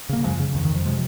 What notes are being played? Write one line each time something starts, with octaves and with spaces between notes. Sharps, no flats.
C#3 A#3
F#2 F3 G#3
C#3
F2 D#3
D#3
F2 F3
C3 F3 G#3